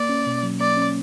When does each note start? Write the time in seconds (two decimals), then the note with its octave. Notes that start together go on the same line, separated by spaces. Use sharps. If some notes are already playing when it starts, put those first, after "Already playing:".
Already playing: A#3 D5
0.09 C#4
0.26 B2
0.43 F#3
0.60 A#3 D5
0.77 C#4